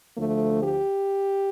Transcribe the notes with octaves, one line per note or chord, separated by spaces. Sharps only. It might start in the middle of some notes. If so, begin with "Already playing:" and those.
D2 D3 F3 A3
G4